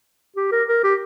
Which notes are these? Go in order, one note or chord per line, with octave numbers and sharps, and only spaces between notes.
G4
A#4
A#4
G4